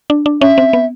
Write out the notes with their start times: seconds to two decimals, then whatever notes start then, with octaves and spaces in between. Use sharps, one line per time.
0.10 D4
0.26 D4
0.41 C#4 E5
0.58 C4
0.73 B3